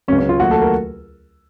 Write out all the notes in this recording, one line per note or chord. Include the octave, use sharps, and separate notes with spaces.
C#2 C#3 F#3 C#4
C#4
F4
D#2 D#3 F#3 A3 F#4
A4
A#4